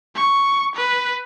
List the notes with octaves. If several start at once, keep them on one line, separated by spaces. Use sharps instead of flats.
C#6
B4